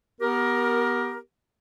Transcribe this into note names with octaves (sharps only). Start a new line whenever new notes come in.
B3 G4 A#4